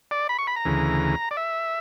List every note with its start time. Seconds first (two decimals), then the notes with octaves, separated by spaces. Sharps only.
0.11 D5
0.29 B5
0.38 C#6
0.47 B5
0.56 A#5
0.65 D2 C#3 E3
1.31 D5
1.37 E5